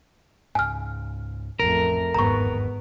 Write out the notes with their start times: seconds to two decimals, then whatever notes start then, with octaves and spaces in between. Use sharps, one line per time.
0.55 C#2 G#2 G#5 F6
1.60 A1 F2 A3 A#4
2.14 G1 E2 G#2 D#3 B3 A#5 C#6